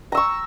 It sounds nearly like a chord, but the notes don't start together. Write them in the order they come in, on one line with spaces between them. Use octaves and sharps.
A#5 E6 C#6